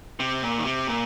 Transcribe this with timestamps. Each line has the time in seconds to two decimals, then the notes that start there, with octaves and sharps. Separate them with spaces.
0.20 C3
0.42 A#2
0.58 D#3
0.65 C3
0.87 A#2